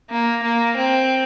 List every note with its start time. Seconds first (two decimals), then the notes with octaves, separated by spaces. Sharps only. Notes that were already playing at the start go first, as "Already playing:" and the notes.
0.10 A#3
0.43 A#3
0.77 C4